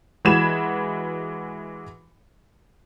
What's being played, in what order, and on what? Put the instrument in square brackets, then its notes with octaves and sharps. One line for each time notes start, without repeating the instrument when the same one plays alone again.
[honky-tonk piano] E3 G#3 F#4 B5 G#6 E7